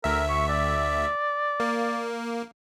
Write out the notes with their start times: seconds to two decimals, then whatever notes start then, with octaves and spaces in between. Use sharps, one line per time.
0.04 D2 A#4 E5
0.29 C#6
0.48 D5
1.60 A#3